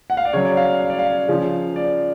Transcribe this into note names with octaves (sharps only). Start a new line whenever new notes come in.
F#5
F5
D5
C#3 F#3 C#5
D5
F5
F5
D5
F5
C#3 F3
D5